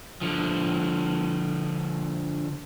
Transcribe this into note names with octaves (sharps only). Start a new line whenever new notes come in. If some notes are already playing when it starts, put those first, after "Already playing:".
D3 F3